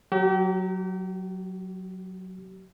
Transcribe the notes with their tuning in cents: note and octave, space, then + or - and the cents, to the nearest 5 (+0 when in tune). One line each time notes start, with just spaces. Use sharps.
F#3 +0 G4 -40